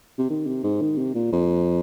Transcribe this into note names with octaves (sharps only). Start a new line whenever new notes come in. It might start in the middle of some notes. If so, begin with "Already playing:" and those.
C3
D#3
C3
G#2
D#3
C3
A#2
F2